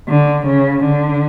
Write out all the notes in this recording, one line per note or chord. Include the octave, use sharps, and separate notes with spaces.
D3
C#3
D3